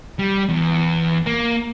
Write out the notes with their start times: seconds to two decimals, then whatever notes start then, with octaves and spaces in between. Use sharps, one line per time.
0.19 G3
0.49 E2
1.26 A#3